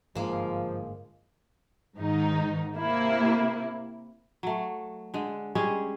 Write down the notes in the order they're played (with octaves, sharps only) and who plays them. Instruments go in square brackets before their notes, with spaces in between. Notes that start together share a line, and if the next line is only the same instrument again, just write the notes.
[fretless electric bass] G1 G#2 D3 [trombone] F3 [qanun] G#3 A#3
[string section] G#2 D#3 D#4
C3 A#3 E4
[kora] F#3 A3
D3 G#3
G3 G#3 C#4 G#4